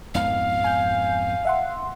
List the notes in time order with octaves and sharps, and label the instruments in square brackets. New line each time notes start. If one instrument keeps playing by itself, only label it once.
[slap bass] F2 G#2 B3 [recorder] F5
[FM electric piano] G#5 G6
E5 F#5 C6